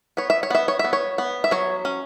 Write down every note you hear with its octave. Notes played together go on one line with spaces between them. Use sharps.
B3 C#5
E5
C#5
B3 E5
C#5
E5
B3
C#5
B3
E5
F#3 C#5
C#4